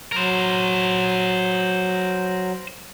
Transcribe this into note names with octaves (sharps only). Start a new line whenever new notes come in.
F#3 A#4 C5